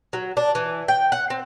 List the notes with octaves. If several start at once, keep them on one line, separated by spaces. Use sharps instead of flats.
F#3
D4
E3
G5
F#5
C4